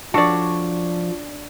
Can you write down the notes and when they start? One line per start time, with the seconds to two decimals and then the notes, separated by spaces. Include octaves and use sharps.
0.14 F3 D4 F#4 A4 C#5 D5